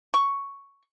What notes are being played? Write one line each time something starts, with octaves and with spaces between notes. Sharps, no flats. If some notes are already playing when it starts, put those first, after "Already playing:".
C#6